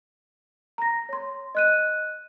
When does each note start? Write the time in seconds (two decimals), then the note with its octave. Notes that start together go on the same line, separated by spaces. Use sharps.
0.78 A#5 A#6
1.09 C#5 C6
1.55 D#5 F#6 D#7